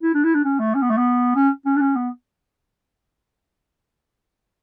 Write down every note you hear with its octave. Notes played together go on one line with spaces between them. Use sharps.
E4
D4
E4
D4
C#4
A3
C#4
B3
A3
B3
C#4
C#4
D4
C#4
B3